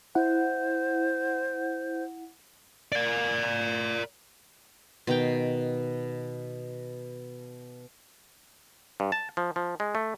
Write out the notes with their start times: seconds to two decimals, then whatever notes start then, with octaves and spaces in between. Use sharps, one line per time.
0.15 E4 C5 F#5
2.92 A#4 D5
5.07 B2 D#3 F5 G5
9.00 G2
9.12 A5
9.37 F3
9.56 F3
9.80 G#3
9.95 A3